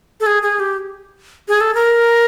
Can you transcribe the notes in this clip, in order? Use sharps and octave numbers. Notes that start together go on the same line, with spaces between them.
A4
G#4
G#4
G4
G#4
A4
A#4